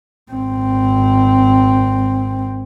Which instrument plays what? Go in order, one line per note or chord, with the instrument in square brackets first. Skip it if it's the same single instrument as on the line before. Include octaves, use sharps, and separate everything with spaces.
[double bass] G#1 C4